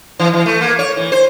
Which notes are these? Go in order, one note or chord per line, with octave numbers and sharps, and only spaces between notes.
E3
E3
A3
A#3
C#5
E3
C5